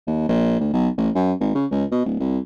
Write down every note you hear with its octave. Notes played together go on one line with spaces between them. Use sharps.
D#2
A#1
D2
B1
A1
F#2
G#1
C#3
C#2
B2
D1
C2